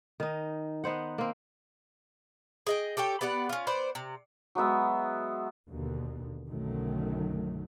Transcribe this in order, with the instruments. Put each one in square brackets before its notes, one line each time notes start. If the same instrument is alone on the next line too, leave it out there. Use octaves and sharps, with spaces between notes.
[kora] D#3 D#4
B3 D#4 C5 F#5
A#3 C4
[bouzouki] G#4 D#5 G5
G4 A4 C#5 G5
B3 G4 D5 F#5
C#4 F4
B3 C5 D5
C3
[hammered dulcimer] F#3 G#3 B3 E5
[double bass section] D#2 B2 D3
B1 F#2 D3 D#3 F#3 A3